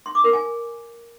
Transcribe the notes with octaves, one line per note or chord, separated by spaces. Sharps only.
C6
D6
A#4
G#5